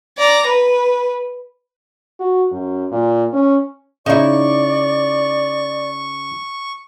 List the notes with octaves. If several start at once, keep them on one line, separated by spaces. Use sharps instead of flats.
D5 A#5
B4
F#4
F#2
A#2
C#4
C#3 D#4 E4 D5 C#6